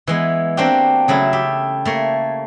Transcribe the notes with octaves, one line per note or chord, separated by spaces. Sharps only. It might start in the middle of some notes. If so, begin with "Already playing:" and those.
E3 G#3 B3
A#3 C4 D4 F#4 G4
C#3 F#3 A3 E4
G4 E5
A3 A#3 C#5